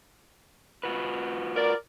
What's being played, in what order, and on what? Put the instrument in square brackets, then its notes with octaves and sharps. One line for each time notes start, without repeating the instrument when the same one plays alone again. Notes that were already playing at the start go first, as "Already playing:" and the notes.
[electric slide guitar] F4 F#4 B4
[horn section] A#4 D5